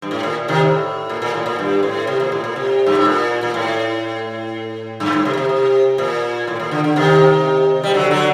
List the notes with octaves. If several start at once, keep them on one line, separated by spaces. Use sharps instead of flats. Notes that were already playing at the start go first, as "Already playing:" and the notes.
G2
A2
A#2
C3 D#3
A2
A#2
A#2
A2
A#2
G2
A2
C3
A#2
A2
A#2
C3
G2
A2
A#2
A#2
A2
G2
A2
C3
A#2
C3
C3
A#2
A2
A#2
D3
D3
C3 D#3
G3
D3 F#3
D3 F#3